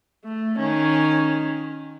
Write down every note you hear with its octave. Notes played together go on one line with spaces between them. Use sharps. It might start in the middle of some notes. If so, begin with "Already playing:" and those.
A3
D#3 C#4